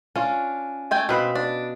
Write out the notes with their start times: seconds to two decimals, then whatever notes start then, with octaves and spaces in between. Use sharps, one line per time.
0.16 C#4 D4 F4
0.91 A3 G5 G#5
1.09 B2 C4 B4 F5
1.35 D4